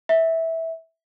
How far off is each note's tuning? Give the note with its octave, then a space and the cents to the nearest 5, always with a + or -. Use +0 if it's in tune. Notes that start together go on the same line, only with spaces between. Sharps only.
E5 -15